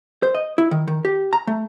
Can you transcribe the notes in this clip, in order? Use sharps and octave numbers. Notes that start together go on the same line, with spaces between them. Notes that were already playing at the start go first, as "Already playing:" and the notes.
C5
D#5
E4
D#3
D#3
G4
A#5
A3